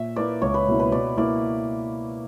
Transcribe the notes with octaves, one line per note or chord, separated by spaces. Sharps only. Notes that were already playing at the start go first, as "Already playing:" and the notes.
Already playing: A#2 E5
A#3 E4 B4 D5
C#2 C#5
B4
B2 A#3 E4
B4
B2 D5
A#3 E4 D5